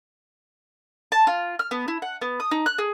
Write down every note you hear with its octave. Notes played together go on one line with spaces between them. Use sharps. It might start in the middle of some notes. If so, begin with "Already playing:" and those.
A5
F4
F6
B3
E4
F#5
B3
D#6
D#4
F#6
G#4